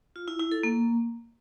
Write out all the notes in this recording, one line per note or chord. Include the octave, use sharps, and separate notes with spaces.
F4
E4
E4
A4
A#3